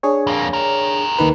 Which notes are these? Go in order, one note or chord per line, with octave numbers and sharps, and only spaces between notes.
D4 G#4 C#5
F2 A#3
G4 A#4
D#2 D#3 B4